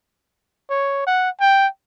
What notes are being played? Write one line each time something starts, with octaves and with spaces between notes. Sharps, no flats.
C#5
F#5
G5